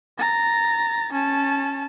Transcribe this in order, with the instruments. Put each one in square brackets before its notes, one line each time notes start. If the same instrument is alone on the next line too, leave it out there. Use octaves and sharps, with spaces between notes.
[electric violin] A#5 A6
C#4 A5